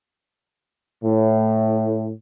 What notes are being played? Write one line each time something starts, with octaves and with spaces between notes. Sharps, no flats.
A2